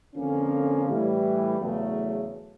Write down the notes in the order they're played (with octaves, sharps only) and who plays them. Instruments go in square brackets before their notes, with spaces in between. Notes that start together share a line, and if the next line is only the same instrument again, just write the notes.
[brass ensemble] F2 D3 F3 A#3 C#4
A2 E3 G3
E2 C#3 F#3 A3